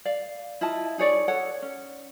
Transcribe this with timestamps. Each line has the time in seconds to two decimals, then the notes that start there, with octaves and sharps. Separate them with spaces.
0.05 D5 F5
0.61 E4 F4 D#5 A5
0.98 D#4 G#4 C#5 D5
1.28 A4 C#5 F#5
1.62 C#4